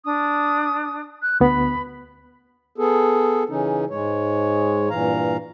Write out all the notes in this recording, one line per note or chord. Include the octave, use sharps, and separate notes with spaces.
D4 D#6
F#6
D2 B3 B5
B3 G#4 A4
C#3 E3 C#4 D#4
G#2 G#3 C#5
G2 A#2 E3 F5 A#5